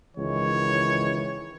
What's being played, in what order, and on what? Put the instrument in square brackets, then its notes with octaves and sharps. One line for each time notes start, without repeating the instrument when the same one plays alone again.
[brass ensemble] C#2 D#3 E3 [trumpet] C#5